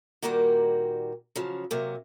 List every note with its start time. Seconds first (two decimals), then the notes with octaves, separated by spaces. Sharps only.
0.22 A#2 D3 D#3 G3 A#3 F#4
1.36 C#3 F3 F#3
1.71 C3 F#3 A#3